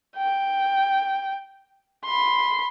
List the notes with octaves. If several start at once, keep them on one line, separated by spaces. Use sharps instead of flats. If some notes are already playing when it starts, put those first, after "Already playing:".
G5
B5 C6